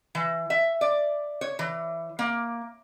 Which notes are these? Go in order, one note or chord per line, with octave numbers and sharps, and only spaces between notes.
E3
E5
D5
C#5
E3
A#3